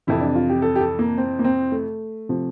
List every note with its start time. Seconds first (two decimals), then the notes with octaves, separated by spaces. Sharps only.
0.07 F2 C3 E3 E4
0.21 D4
0.35 F4
0.49 G4
0.62 A4
0.76 G4
0.80 A4
0.99 A#3
1.18 C4
1.39 A#3
1.45 C4
1.72 A3
2.29 C3 F3